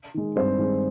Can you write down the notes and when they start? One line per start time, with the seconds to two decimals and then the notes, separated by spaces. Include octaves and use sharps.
0.14 D#3 G#3
0.36 G2 C4 C5
0.59 D#3 G#3